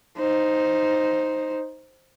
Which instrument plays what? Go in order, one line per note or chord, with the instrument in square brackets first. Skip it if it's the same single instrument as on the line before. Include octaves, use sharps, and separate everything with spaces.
[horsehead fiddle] D#4 C5